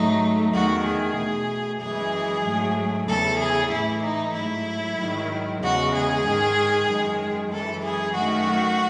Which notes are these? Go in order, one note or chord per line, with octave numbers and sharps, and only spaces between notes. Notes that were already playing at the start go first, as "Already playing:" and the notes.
Already playing: G#2 F#3 A3 D#4
E2 D#3 A3 F#4
G#4
B2 A3
F#2 E3 G#3 G#4
G#2 F#3 A3
E2 C#3 E3 A4
G#4
A2 E3 A3 E4
D#4
G#2 F#3 A3 E4
G#2 D#3 F#3
E2 C#3 G#3 F#4
G#4
G#2 D#3 G#3
F#2 D#3 G#3
F#2 E3 G#3 A4
G#4
F#2 D#3 A3 F#4